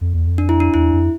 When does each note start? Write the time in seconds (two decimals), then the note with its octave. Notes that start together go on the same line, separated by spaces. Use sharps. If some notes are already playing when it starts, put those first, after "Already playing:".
0.01 F2
0.13 E2
0.27 F2
0.38 D4
0.49 E4
0.60 D4
0.74 E2 E4
0.93 F2